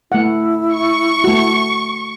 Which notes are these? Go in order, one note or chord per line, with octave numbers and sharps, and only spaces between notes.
A3 E4 F#5
C#6
A3 F#4